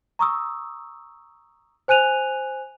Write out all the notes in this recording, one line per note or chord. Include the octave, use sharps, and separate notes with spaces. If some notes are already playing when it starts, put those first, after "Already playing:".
A#5 C#6 D#6 E6
C5 G#5 F#6 D#7 F7